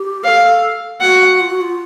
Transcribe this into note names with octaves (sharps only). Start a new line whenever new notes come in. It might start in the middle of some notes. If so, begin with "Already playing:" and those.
Already playing: G4
A4 C#5 F5
F#4 F#5
F4
F#4
F4